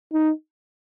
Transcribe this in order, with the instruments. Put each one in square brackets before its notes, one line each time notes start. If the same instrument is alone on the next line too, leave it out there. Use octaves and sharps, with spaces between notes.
[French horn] D#4